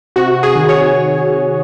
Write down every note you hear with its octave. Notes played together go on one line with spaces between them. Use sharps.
C3 F#4
G#4
D#3
C#5